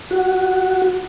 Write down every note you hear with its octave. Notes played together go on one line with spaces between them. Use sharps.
F#4